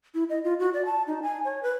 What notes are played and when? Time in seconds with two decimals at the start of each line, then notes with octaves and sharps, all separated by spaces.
0.14 E4
0.29 D#5
0.44 F4
0.59 F#4
0.74 D5
0.85 A5
1.07 D#4
1.22 G#5
1.45 C#5
1.63 B4